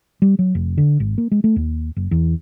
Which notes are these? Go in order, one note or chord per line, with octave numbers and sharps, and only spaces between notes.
G3
F#3
F1
D3
G#1
A#3
G#3
A3
D#2
F#1
E2